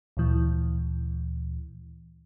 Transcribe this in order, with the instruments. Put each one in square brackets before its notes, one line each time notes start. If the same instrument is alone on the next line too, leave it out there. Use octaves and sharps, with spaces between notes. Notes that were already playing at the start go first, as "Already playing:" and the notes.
[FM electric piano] D2 A#2 E3